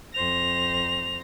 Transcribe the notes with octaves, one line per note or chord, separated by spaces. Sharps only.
F2 C5 A#6 F7